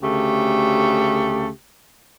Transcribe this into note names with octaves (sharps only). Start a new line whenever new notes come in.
D2 C#3 A3 G4